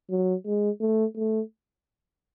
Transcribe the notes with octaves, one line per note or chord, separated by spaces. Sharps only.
F#3
G#3
A3
A3